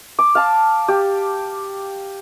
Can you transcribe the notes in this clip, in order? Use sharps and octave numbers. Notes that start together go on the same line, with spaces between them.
D6
F5 A5
G4